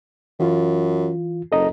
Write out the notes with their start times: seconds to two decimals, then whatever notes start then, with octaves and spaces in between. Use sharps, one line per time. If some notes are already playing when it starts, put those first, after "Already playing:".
0.40 F#2 E3 F4
1.52 F#1 A4 D#5 A#5